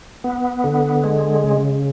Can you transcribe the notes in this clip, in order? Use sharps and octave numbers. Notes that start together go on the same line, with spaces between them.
B3
D3
G#3
C#3